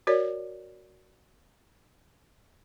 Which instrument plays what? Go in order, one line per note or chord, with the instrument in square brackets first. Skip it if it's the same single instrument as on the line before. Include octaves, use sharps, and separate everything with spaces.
[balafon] F#4 A#4 C#5 D5